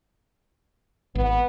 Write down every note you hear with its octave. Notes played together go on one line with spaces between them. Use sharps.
G#1 B3